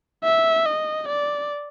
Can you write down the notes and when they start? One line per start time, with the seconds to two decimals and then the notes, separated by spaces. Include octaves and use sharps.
0.24 E5
0.66 D#5
1.08 D5